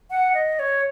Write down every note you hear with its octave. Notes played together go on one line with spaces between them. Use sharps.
F#5
D#5
C#5